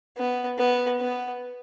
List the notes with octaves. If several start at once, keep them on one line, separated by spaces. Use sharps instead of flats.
B3
B3
B3